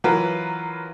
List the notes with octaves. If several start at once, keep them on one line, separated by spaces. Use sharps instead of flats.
E3 F#3 F4 A#4 B4